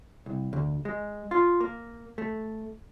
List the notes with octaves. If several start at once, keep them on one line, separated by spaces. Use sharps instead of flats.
C2
D2
G#3
F4
A#3
A3